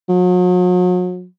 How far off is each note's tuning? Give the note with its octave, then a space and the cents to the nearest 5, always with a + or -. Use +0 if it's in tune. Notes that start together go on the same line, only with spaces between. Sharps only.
F#3 -40